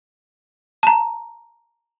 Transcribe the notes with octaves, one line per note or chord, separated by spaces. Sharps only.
A5 A#5